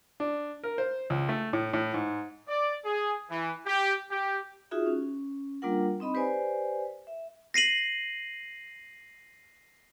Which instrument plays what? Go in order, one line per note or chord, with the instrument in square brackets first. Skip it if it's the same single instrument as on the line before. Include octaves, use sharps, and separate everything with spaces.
[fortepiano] D4
A#4
C5
C#2
A3
A2
A2
G#2
[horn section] D5
G#4
E3
G4
G4
[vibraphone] D#4 F4 F#4 G#4 E5
C#4
G3 A#3 D4 F4 A#4 F#5
C4 D#4 D#5 B5
G4 B4 C5 D5 G#5
E5
[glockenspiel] A#6 C7 D#7 F#7